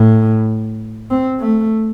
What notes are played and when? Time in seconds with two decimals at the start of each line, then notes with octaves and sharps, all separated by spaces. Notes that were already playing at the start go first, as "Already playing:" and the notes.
Already playing: A2
1.10 C4
1.40 A3